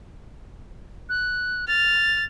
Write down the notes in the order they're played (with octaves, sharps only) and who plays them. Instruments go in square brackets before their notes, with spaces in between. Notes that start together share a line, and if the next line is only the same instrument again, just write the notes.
[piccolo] F#6
[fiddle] F6 [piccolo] A6